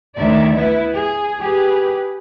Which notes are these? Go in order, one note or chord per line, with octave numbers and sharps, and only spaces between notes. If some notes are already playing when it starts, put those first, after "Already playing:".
D2 D#3 C#5 D5 E5
B3 E4 B4
G#4
G4 G#4 B4